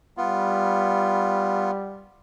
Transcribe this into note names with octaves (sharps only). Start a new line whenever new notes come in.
G3 B3 F4